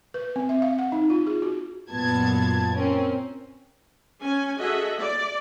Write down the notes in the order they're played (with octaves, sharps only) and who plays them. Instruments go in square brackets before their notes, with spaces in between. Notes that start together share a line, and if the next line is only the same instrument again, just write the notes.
[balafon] B4
C4
E5
F5
F#5
D#4
F4
G#4
F#4
[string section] F#2 A#2 B3 A5 G#6
C4 C#4 A#4
[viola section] C#4 G#5
F#4 G#4 A4 D#5 E5 F#5
D5